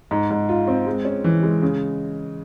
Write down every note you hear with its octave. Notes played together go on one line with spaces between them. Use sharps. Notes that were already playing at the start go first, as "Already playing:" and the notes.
G#2
G#2
F4
C4
G#3
C#4
E3
G#3
C#3